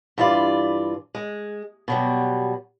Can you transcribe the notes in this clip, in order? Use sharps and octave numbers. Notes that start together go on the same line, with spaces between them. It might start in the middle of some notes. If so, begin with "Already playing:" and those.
G2 E3 F4 D5
G#3
B2 F#3 G3